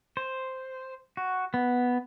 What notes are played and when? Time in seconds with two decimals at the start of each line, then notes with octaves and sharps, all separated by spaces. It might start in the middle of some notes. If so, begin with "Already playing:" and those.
0.17 C5
1.17 F#4
1.54 B3